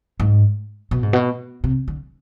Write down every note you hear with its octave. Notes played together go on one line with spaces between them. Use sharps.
G#2
B2
G#2
B2
C3
D3